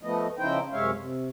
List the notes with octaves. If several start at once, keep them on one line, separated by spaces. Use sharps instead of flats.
F3 A3 B3 D#5
C#3 F3 D#4 E4 C5 G5
F#2 C3 G#3 C#5 E5 F5
C3